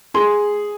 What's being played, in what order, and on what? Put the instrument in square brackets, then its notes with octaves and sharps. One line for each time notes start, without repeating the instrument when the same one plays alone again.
[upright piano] G#4 [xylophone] C6